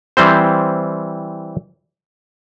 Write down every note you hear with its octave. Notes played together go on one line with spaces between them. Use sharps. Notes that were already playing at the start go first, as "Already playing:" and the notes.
E3 G3 C4 C5